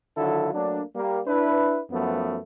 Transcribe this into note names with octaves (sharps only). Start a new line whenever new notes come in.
D3 D#3 F#3 E4 F4 A4
F#3 A3 A#3 D4
G3 A#3
D4 E4 B4
F#2 F3 A3 B3